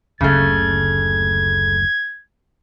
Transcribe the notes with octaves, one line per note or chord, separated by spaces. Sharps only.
F#1 D2 C#3 A3 G#6